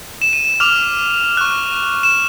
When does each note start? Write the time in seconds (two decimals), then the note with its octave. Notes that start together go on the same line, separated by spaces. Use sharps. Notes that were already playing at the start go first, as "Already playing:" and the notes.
0.22 E7
0.33 D#7
0.45 E7
0.60 D6 F6 F7
1.37 C#6 F#6
2.03 E7